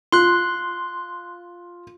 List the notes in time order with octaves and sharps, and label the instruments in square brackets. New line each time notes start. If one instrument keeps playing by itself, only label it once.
[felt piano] F4 [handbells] C6 F#6